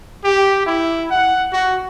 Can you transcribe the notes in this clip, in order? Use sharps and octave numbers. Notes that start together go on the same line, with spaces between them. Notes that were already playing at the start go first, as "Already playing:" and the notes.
G4
E4
F#5
F#4